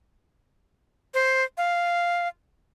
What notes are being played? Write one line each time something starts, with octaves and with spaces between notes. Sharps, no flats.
C5
F5